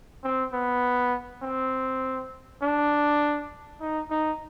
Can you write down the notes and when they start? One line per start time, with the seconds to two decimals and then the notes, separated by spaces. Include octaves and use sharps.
0.24 C4
0.53 B3
1.42 C4
2.62 D4
3.81 D#4
4.10 D#4